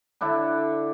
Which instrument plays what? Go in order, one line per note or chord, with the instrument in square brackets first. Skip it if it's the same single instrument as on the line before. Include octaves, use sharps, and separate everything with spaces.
[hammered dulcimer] D3 D4 E4 A4